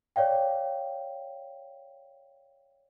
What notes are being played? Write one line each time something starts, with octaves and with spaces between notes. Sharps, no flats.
C#5 D5 F5 G5